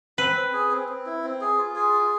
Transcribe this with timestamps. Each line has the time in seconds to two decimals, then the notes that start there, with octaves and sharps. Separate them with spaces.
0.18 C4 B4
0.36 C4
0.53 G#4
0.71 C4
0.88 C4
1.06 E4
1.24 C4
1.41 G#4
1.58 F4
1.75 G#4
1.93 F4